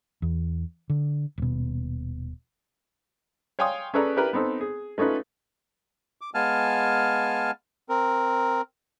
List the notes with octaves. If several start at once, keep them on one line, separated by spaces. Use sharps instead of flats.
E2
D3
D#1 B2
C#5 F5 G5 G#5 C6 D#6
C#4 G#4 A4 B4 D5 A#5
D4 E4 G4 A#4 B4
B3 C4 D#4 A4
G#4
A3 C#4 D#4 F4 B4
D6
G#3 B3 F5 G#5 A5 F6
C4 A#4